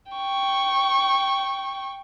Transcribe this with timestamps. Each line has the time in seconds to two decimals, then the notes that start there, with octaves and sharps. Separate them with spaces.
0.12 G5 C#6